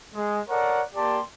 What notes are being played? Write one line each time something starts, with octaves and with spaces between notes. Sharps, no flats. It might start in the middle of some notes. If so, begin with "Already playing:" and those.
G#3
A4 A#4 C#5 D5 F#5
A#3 G4 D5 A5 C6